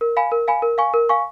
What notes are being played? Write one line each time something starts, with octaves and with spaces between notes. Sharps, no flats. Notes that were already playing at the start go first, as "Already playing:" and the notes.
A#4
F5 G#5 B5
A#4
F5 G#5 B5
A#4
F5 G#5 C#6
A#4
F5 G#5 C#6